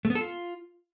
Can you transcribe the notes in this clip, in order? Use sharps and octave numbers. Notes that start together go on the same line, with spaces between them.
A3
B3
A4
F4